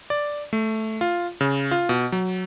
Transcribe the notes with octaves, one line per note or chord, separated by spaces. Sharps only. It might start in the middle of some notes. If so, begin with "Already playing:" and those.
D5
A3
F4
C#3
F4
B2
F#3